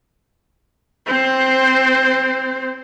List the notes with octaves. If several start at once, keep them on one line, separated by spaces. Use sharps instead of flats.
C4 C5